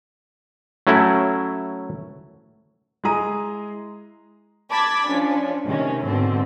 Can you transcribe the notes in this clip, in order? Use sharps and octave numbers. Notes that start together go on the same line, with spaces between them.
F#3 A3 C#4 E4
G#3 E4 G#4 A#5 D#7
A5 B5 D6 G#6 A6 B6
F3 C#4 D4
C3 D#3 C#4
G#2 B2 D3 C4